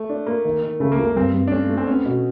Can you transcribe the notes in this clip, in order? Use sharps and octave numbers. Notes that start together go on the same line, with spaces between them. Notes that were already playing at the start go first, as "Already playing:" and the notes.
Already playing: A3
D4
A#3
D#3
D#3
C#3 A3
A#3
C#2
A#3
G2 C4
G2
D4
A3 C#4
A3
C4
B3 C#4
B2